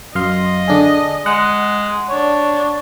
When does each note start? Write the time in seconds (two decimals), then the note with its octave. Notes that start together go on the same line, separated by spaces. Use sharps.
0.15 F#2 D#5 F5 C6
0.68 D3 D4 G#4
1.26 G#3 F#5
2.09 D4 C#5